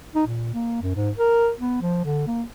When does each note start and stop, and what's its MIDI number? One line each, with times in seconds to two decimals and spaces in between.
0.15 0.24 63
0.27 0.53 46
0.54 0.80 58
0.82 0.95 42
0.95 1.11 44
1.18 1.51 70
1.60 1.79 59
1.82 2.02 53
2.05 2.24 50
2.27 2.43 58